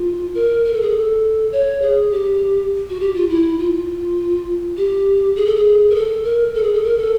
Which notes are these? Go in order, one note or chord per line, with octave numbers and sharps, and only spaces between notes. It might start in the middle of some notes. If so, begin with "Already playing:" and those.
Already playing: F4
A#4
A#4
A4
G#4
A4
C#5
G#4
G4
F#4
G4
F4
E4
F4
G4
G#4
A4
G#4
A#4
A4
A#4
A4
G#4
A4
A#4
A4